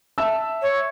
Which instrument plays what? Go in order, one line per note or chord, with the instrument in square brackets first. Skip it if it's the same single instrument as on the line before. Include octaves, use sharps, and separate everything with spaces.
[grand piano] E5 A5 E6
[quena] C#5